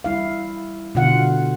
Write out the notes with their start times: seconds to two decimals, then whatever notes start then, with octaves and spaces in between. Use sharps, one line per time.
0.04 G3 E4 F5
0.95 B2 D3 F4 F5 F#5